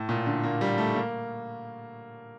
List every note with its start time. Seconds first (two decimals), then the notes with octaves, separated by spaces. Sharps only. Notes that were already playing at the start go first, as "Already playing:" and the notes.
Already playing: A2
0.09 A#2
0.26 D3
0.44 A#3
0.61 G3
0.78 A3
0.95 A#3